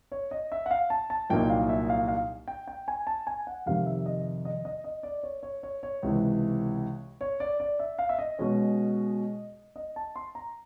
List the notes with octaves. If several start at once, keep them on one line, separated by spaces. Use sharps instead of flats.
C#5
D#5
E5
F#5
F5
A5
A5
C2 A#2 F#3 A#3 D#4 G5
F5
E5
F5
F5
G5
G5
G#5
A5
G#5
F#5
F2 C3 D#3 G3 F5
E5
D#5
D#5
D#5
D#5
D5
C#5
C#5
C#5
C#5
C#2 C3 E3
C#5
D5
D5
E5
F5
E5
D#5
B2 G#3 C#4
D#5
A5
C6
A#5